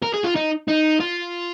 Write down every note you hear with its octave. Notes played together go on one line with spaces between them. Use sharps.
A#4
G#4
F4
D#4
D#4
F4